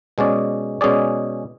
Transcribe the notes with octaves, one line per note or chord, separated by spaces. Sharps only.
B2 G#3 C#4 G#4 D5
B2 G#3 C#4 G#4 D5